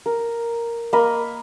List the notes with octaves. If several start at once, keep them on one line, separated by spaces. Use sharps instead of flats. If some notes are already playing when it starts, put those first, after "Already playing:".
A#4
A#3 D#5 B5